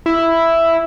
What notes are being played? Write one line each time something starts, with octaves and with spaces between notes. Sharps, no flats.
E4